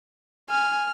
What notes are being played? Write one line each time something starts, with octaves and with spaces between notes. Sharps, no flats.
G#5 F6